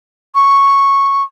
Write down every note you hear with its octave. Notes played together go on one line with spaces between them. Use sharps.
C#6